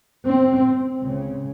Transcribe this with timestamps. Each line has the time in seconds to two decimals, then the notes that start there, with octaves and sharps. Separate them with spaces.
0.27 C4
1.01 C#2 C#3